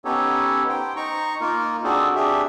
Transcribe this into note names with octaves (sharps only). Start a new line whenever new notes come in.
B3 C#4 D#4 G4 A4 C#5
C5 G5
D#4 A#5 C#6
A#3 D#4 F4 A#4
C4 D4 F#4 G#4 A4 C5
D4 G4 G#4 E5